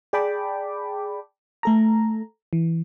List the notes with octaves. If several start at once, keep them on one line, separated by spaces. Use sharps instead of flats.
G#4 D5 G5 A5 B5 D6
A3 A4 A#5
E3